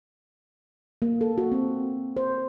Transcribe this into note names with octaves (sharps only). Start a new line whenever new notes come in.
A#3
A4
F#4
C4
C5